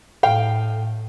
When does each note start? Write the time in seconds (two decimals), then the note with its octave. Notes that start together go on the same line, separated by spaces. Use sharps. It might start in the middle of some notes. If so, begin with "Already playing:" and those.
0.23 A2 F5 G5